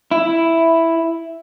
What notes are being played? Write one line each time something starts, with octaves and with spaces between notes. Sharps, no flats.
E4